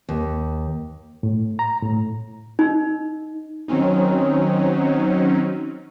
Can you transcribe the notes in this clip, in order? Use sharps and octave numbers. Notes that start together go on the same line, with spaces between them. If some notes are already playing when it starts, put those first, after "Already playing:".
D#2
A2
A#5
A2
D#4
D#3 F#3 C4 C#4 D#4